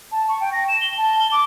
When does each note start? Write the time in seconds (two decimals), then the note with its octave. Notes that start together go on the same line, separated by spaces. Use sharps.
0.12 A5
0.29 C#6
0.41 G5
0.52 A#6
0.68 E7
0.81 G7
0.98 A5
1.19 G7
1.32 D6